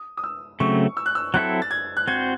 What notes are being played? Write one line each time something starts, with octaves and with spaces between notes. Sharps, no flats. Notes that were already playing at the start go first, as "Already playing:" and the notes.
Already playing: D#6
D#6
E6
C#3 F#3 A3 C4 C#6
E6
F#6
E6
F#3 C4 E4 A4 F#6
A6
G#6
F#6
C4 F#4 C5 G#6